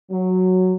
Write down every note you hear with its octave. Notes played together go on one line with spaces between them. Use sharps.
F#3